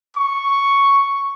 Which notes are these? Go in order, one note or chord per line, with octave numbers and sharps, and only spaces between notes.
C#6